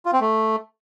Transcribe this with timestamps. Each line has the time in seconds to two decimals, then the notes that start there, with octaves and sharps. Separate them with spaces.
0.05 F4
0.13 C4
0.21 A3